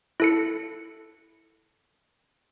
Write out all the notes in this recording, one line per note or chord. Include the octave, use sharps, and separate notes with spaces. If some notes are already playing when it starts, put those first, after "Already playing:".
E4 A4 C#7